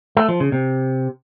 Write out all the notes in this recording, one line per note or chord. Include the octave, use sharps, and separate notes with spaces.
A3
F3
C#3
C3